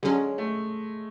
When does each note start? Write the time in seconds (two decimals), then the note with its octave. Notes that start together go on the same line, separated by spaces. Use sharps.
0.03 D3 F#3 G#3 C#4
0.38 A3